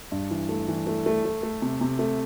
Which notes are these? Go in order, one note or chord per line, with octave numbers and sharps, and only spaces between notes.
G2
E3
A3
E3
A3
A3
A3
A3
C3
C3
A3